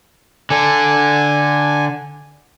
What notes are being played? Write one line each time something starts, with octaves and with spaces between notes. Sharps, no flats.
D3 A4 G#5